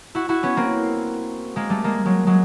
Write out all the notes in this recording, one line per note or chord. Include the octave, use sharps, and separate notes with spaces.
E4 F#4
E4 F#4
B3 C#4
A#3 C4
G#3 A#3
G3 A3
G#3 A#3
F#3 G#3
F#3 G#3